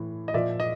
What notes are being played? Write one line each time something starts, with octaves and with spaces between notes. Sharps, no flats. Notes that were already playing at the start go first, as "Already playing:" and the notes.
Already playing: A2 E3
D#5
A#2 F3 D5 E5
D#5